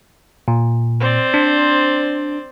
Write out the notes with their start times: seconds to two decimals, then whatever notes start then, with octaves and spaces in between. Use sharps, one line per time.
0.48 A#2
1.01 C4 C5 D5
1.34 D4